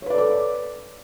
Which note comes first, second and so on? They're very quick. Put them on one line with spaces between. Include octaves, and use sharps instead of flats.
C#5 B4 D5 A4 D6